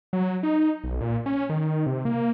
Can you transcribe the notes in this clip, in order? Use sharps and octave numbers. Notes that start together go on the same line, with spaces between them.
F#3
D#4
B1
A#2
C#4
D#3
C3
A#3